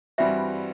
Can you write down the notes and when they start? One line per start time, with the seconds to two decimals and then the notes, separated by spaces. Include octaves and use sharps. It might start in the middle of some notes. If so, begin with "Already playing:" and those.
0.18 G2 E3 G3 C4 F#4 E5